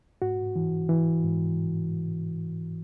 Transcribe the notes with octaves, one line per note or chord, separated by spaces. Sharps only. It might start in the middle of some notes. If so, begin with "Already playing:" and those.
G#2 F#4
E3
E3
G#2